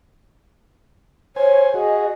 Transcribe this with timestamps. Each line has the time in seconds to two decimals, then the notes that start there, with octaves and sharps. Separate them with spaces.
1.36 C5 C#5 G#5
1.74 F#4 G#4 D#5